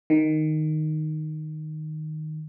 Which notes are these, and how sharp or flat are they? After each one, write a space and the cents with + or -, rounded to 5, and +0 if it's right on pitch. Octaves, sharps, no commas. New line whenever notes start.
D#3 -5